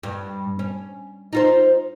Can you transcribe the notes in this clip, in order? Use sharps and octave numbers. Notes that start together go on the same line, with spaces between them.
G2
C#4
D#4 F4 C5